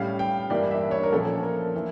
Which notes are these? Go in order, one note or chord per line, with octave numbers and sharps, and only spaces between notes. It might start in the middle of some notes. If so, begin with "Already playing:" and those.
Already playing: A2 G3 C#4 F5
G5
G2 E3 G3 A#3 D4 D5
E5
C#5
A#4
A#2 F3 A3 C#4 A4
A#4
E3